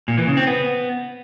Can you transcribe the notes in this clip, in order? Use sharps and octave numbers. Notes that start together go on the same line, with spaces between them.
A#2
E3
C#3
C4
B3